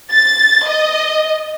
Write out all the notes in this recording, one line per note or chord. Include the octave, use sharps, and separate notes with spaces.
A6
D#5